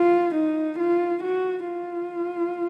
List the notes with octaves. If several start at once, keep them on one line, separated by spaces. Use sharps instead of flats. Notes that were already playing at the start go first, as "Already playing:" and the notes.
Already playing: F4
D#4
F4
F#4
F4